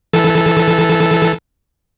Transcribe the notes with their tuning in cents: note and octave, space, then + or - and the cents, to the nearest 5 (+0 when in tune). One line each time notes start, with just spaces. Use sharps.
E3 +0 A4 -10